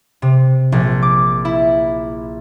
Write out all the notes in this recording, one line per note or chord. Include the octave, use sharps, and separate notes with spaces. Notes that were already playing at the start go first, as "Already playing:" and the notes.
C3
A#1
D6
E4